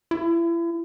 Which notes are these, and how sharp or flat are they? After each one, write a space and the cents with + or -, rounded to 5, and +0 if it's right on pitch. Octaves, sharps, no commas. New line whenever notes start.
E4 +35